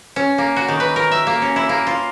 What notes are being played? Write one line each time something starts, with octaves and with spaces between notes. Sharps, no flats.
C#4
A#3
F#4
D#3
B4
A#4
E5
A#3
C#4
E4
A#3
F4